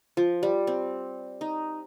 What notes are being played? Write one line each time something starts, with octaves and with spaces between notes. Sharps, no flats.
F3
G3
C4
D#4